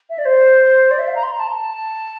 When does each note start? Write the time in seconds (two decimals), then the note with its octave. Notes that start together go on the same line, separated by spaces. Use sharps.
0.10 E5
0.19 D5
0.25 C5
0.91 D5
0.99 E5
1.07 F5
1.15 A#5
1.23 C6
1.32 A#5
1.40 A5
1.47 A#5
1.55 A5